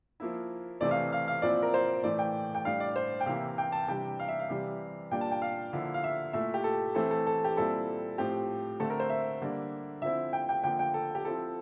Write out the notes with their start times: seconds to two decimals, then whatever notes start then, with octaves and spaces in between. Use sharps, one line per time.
0.20 F3 A#3 E4
0.81 C3 E3 A3 C4 D5
0.91 F5
1.13 F5
1.28 F5
1.42 A#2 F3 C4 E4 D5
1.63 A#4
1.74 C5
2.03 A2 E3 A3 D5
2.19 G5
2.55 G5
2.65 A2 G3 D4 F5
2.80 D5
2.96 C5
3.20 G5
3.26 C3 E3 A#3 E4 F5
3.58 G5
3.72 A5
3.88 C3 E3 G3 D4 G5
4.19 F5
4.28 E5
4.39 F5
4.50 C3 E3 G3
5.12 A#2 G3 A#3 D4 G5
5.21 A5
5.31 G5
5.42 F5
5.73 D3 F3 A#3 E4
5.94 F5
6.04 E5
6.33 A#2 A3 E4 E5
6.54 G4
6.64 A4
6.95 E3 A3 C4 E4 A4
7.11 A4
7.27 A4
7.44 G4
7.57 A#2 G3 C4 E4 A4
8.18 A2 F3 C4 G4
8.80 D3 A3 C4 A4
8.90 A#4
9.00 C5
9.10 E5
9.41 D3 G3 A#3 D4
10.02 D3 F3 C4 E4 E5
10.33 G5
10.49 G5
10.64 D3 F3 A#3 G5
10.79 G5
10.94 A4
11.15 G4
11.25 F3 C4 E4 A4